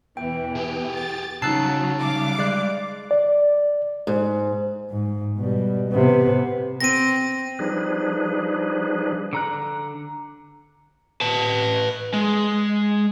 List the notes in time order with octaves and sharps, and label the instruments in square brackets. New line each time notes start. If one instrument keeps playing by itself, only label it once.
[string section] E2 B2 E3 [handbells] G5
[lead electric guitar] G4 G#4
[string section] A6
[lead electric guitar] C#3 [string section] F#3 [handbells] D#4 F#6 C7 [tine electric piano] A5 E6 A6
[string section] G3 F5 D6
[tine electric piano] G#3 D5 F#6 [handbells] C7
[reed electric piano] D5
[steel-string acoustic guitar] G#2
[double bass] G#2
B2 G3
C3 B3
[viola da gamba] C4 [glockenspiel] A#6 D#7
[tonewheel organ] F3 G3 D4 D#4 G#4 B4
[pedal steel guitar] D3 A#5 F#6
[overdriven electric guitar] B4 A5
G#3